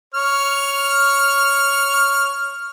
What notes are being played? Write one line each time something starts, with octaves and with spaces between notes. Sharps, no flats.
C#5 F6